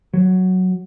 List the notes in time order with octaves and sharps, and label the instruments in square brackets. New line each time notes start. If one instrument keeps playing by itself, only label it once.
[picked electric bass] F#3